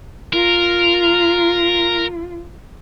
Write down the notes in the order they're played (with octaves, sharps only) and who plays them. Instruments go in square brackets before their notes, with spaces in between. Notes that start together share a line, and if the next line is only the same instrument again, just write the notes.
[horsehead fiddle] F4 [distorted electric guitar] A#4